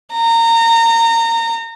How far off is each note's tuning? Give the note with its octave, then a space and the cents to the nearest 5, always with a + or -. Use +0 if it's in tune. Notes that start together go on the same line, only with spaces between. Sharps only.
A#5 -25